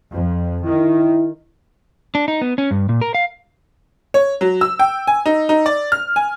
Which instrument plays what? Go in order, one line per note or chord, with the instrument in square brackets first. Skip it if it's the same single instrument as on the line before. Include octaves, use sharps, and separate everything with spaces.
[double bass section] F2
[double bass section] D#3 [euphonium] E4
[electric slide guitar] D4
D#4
B3
C#4
G2
A#2
A#4
F5
[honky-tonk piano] C#5
F#3
E6
G5
G#5
D#4
D#4
D5
F6
G#5